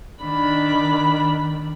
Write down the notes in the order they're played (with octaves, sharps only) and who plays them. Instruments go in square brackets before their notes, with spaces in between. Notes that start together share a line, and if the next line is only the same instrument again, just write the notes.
[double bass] D#3 [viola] D4 B5